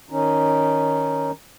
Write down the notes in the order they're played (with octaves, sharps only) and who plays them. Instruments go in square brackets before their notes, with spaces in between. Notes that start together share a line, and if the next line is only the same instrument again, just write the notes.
[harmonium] D#3 C#4 D#4